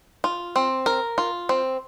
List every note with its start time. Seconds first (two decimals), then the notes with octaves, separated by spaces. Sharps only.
0.24 F4
0.56 C4
0.86 A#4
1.18 F4
1.49 C4